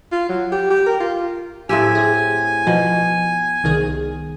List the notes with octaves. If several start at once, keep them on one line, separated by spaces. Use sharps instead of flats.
F4
F#3
G4
G4
A#4
F4
A2 C4 G4 G#5 E6
G#4
B2 F3
C2 D#3 G#4